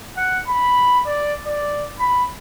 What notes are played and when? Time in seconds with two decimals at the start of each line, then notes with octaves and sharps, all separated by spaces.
0.17 F#5
0.48 B5
1.07 D5
1.46 D5
2.00 B5